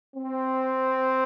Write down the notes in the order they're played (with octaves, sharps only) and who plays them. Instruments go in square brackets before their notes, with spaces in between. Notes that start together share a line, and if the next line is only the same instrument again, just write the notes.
[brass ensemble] C4